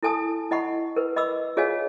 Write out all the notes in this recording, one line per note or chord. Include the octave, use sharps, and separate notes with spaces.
E4 A4 G#5 A5 D#6
E4 D#5 F#5 B5 C#6
A#4 B4
D#5 B5 D6 E6
F4 G#4 C#5 D#5 F5 G#5